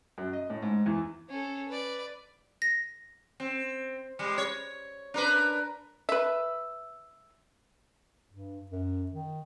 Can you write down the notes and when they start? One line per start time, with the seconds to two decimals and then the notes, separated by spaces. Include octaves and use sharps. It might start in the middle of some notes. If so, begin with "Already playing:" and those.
0.18 F#2
0.33 D#5
0.50 A2
0.62 G#2
0.86 E2
1.29 C#4 A4
1.68 B4 D5
2.62 A#6
3.40 C4
4.19 G3 G#3
4.38 C#5
5.14 D4 A#4 B4
6.09 B4 E5
8.31 G2
8.71 F#2
9.11 D#3